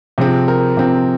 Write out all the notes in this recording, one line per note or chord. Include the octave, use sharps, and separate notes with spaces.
C3 F3 C4 G#4
A#4
C3 F3 C4